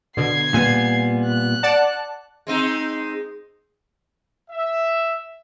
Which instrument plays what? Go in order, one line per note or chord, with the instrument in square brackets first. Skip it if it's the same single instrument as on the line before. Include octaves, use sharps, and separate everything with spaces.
[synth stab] B2 D3 [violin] G#6 C7
[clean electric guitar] A#2 G3 B3 [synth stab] G#5
[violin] F#6
[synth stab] D5 F#5 A5
[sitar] G#3 C4 D#4
[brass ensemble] E5